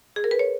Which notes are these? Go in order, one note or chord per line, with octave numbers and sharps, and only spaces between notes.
G#4
A#4
B4
C#5